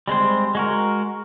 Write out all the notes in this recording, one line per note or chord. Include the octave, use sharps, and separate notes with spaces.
G3 G#3 C4 C5
G#3 F#4 A#4